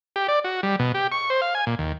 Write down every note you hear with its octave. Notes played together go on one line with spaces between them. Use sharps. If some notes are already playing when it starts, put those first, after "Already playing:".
G4
D5
F#4
G3
B2
G4
C#6
C5
F5
G#5
A#2
D#2